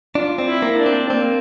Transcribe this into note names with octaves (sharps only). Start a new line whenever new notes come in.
D4 F4
C4
E4
A#3
D4
C4
A#3 C4